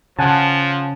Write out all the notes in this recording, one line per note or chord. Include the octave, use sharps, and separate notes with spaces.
C#3 F3 F#5 G#5 A5